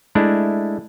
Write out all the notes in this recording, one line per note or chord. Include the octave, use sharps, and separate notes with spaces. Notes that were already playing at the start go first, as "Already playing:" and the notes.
G#3 A3 D4 E4